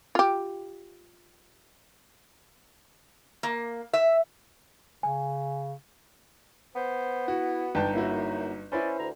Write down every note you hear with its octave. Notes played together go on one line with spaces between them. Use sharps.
F4 G4
A#3
E5
C#3 G#5
B3 C5
E4 F#4
G1 D#4 G5 A5 G6
F#2 A#3 E4 F#4
C#4 E4 B4 C5 D5
D2 A#5